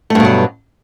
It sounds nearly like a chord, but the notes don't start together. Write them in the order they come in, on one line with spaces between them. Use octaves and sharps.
A3 G2 B2 F#3